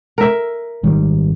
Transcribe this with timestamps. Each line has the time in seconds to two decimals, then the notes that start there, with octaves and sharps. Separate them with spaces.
0.18 A#4 E5
0.83 G#1 D#3 G3